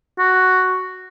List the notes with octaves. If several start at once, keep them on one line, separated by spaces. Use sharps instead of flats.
F#4